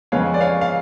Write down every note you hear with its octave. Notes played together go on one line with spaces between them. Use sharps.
F2 C#3 G#3 B3 C#5 F5
D5
C#5 F5
F5